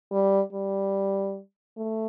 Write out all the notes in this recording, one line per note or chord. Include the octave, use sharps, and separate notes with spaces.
G3
G3
A3